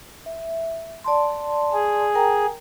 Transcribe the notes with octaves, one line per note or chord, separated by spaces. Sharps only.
E5
D5 A5 C6
G#4
A#4 G5 A#5